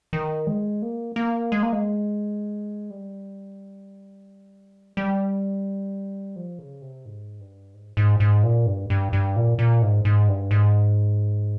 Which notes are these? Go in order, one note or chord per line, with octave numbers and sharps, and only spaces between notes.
D#3
G#3
A#3
A#3
G#3
A#3
G#3
G3
G3
F3
C#3
C3
G#2
G2
G#2
G#2
G#2
A#2
G2
G2
G2
A#2
A#2
G#2
G#2
G2
G#2